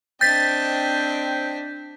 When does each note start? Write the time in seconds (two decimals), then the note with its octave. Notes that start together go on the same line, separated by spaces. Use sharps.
0.21 C4 D4 D#5 G5 G6 A6 B6